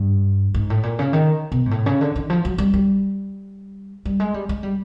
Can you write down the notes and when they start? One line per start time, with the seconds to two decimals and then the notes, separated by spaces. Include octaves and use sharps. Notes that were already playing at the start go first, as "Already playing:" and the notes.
Already playing: G2
0.54 G#2
0.70 A2
0.83 A#2
0.99 C#3
1.13 D#3
1.52 B2
1.66 G#2
1.71 A2
1.86 C#3
2.01 D3
2.16 D#3
2.30 F3
2.45 F#3
2.58 G3
2.74 G3
4.05 G3
4.20 G#3
4.34 G3
4.49 G#3
4.63 G3